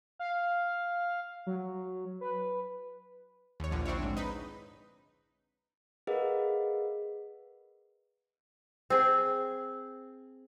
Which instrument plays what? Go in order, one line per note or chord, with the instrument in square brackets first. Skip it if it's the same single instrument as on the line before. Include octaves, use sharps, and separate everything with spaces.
[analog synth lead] F5
F#3
B4
[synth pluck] D#2 C#5
A#1 D3 F3
C4 D4 E4 C#5
G#2
D#4 B4
[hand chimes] G#4 A#4 B4 D#5 F5 F#5
[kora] C4 G#4